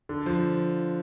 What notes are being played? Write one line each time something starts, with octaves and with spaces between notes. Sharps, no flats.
D3
F3